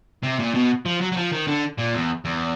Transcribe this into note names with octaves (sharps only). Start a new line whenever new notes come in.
C3
A#2
B2
F3
F#3
F#3
F3
D#3
D3
A#2
E2
E2